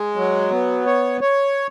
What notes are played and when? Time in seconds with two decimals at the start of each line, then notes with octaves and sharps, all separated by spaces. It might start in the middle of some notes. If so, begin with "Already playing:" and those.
Already playing: G#3
0.16 F#3
0.51 B3
0.86 C#5
1.21 C#5